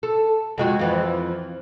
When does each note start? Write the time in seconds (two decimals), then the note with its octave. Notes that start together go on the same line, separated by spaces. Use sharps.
0.03 A4
0.58 F2 G#3 F#4
0.79 F2 E3 F3